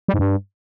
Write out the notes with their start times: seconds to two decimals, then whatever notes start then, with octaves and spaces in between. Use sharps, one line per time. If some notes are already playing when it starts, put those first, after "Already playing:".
0.08 G3
0.14 G#2
0.19 G2